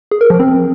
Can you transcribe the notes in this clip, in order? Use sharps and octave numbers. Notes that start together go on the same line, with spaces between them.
G#4
A#4
F3
C4